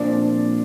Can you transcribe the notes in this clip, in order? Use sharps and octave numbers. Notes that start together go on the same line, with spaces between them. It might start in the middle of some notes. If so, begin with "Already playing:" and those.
Already playing: A#2 F3 C4 D4 D5